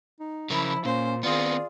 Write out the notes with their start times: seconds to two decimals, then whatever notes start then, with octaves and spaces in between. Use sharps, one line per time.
0.20 D#4
0.50 C#3 F3 E4 A#4 B5
0.85 A#2 A#3 C#4 C5
1.23 D#3 B3 C4 F4 G#4 D5